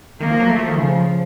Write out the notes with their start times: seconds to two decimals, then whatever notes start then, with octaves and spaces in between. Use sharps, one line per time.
0.21 D#3 A#3
0.30 F3
0.40 F#3
0.50 A3
0.59 F3
0.69 D#3
0.78 C#3 F3